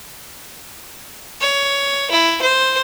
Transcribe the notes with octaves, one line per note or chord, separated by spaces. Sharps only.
C#5
E4
C5